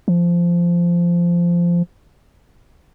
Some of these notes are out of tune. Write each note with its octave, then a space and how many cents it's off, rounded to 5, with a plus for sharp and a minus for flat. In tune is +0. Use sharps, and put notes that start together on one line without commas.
F3 -15